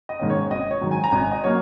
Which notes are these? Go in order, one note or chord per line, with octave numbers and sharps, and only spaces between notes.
D#5
G#2 D#3 A#3 C#4
C#5
G#1 D#5
C#5
G#2 D#3 F#3
G#5
A#5
G#1 G#5
D#5
F#3 A#3 C#5